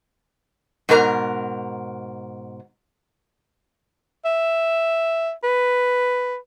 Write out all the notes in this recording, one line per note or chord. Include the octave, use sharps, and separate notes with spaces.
G#2 B2 A#4 A#5
E5
B4